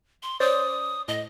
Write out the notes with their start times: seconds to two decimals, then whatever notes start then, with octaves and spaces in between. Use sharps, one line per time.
0.23 C6
0.40 C#4 C5 D5 D#6
1.08 A2 D#5